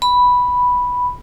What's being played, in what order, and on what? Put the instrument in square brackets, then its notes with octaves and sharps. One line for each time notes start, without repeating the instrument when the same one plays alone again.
[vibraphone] B5